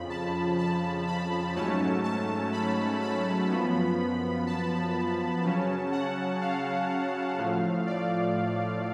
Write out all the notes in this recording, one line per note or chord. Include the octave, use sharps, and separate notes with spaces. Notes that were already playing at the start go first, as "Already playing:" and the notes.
Already playing: F2 C#3 F3 B5
A5
A5
B5
G#2 F#3 A3 C#4 A5
A5
B5
B5
F#2 F3 B3
A5
C#3 F#3 C#4
F#5
F5
A2 F3 A3
D5